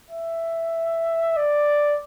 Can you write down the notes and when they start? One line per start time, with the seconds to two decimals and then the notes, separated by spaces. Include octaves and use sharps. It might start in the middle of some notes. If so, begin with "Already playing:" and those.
0.10 E5
1.37 D5